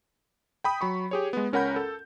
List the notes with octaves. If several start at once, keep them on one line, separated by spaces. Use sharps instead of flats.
G5 B5 D#6
F#3 B5 C#6
G4 G#4 C#5
G#3 B3
C#2 C#4 A#4 F#5 B5 G6
A4